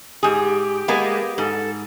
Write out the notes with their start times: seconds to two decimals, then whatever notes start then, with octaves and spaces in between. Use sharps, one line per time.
0.23 G#2 G4 G#4
0.88 G#3 A#3 B3
1.38 G#2 A4